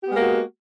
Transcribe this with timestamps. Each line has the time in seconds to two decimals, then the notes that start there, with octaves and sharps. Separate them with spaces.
0.03 G4
0.07 B3
0.11 G#3
0.15 A#3
0.19 F#4